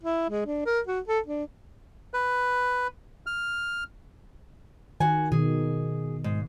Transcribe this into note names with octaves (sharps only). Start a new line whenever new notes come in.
E4
G#3
D4
A#4
F#4
A4
D4
B4
F6
D#3 F#4 F#5 G#5
B2 D#3 G#4
G#2